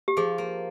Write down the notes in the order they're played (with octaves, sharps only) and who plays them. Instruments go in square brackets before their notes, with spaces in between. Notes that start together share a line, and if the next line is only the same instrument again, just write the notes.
[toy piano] G4
[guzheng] F3 [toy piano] G#4
[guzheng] A#3